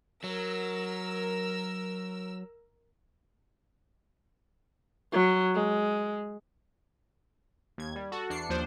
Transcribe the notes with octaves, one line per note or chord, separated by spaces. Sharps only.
F#3 A#4 E6
F#3
G#3
D#2 G#6
G3
F#4 A4
E2 D4 C7 C#7
D#2 F3 D4 C5